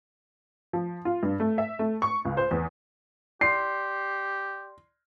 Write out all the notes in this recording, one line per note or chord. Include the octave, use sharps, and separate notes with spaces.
F3
F4
G2
A3
E5
A3
C#6
C#2
C5
E2
G4 D5 C6 C7